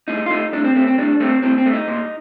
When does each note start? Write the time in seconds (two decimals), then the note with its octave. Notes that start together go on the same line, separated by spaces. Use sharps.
0.08 A2 D#4
0.26 F4
0.30 A3 D#4
0.53 A2 D4
0.64 C4
0.75 A3 C4
0.87 C4
0.98 A2 D4
1.20 A3 C4
1.42 A2 C4
1.58 C4
1.66 A3
1.73 D#4
1.88 A#2